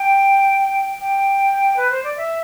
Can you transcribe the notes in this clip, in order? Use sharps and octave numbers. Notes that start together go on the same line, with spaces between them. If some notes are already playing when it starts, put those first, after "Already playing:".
Already playing: G5
G5
B4
C5
D5
E5